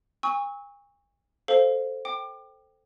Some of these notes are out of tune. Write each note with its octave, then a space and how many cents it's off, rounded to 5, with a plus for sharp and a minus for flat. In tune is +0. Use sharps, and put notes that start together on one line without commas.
G#5 -40 C#6 +0 E6 -30
A4 +0 C5 +0 F5 +0
G5 +0 D6 +30